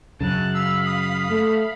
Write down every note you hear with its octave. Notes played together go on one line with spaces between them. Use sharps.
F#2 C#3 A5 F#6
F5 B5 E6
D#6
A3